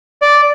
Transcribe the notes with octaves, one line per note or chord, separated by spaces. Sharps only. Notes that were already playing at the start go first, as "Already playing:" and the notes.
D5